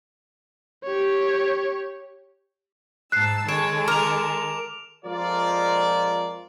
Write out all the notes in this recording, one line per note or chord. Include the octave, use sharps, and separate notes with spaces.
G4 C#5
G#2 A5 E6 F#6 C7
D#3 G#3 A4 C#5 D7 E7
A#4 D6 F7
F2 F3 G#3 F4 A#4 D5